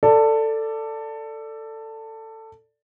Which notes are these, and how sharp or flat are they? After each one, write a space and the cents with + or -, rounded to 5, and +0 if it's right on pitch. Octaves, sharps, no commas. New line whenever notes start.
A4 +15 D5 +0